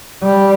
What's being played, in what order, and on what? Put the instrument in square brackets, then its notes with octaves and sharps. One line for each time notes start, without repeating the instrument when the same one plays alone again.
[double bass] G3